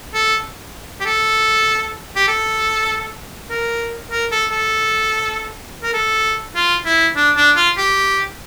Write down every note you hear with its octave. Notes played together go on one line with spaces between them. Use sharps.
A4
G4
A4
G4
A4
A#4
A#4
A4
A4
A#4
A4
F4
E4
D4
D4
F4
G4